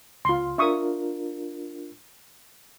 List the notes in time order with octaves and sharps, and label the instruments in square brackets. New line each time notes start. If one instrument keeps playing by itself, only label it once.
[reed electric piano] C#2 [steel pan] F4 C6
[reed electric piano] D4 F4 A#4 [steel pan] E5 C#6 D#6